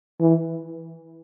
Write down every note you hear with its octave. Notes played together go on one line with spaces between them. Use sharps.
E3